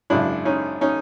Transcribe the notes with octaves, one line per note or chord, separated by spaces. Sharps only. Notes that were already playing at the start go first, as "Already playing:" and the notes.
G#1 F#2 C#3 D4 E4
C#4 D#4
C#4 D#4